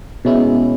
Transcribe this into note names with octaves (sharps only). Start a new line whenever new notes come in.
B2 G#3 C#4 E4